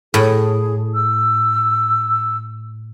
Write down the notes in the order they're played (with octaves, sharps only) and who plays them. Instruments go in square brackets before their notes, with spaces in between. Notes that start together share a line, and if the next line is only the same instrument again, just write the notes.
[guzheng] A2 [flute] G#4
[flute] E6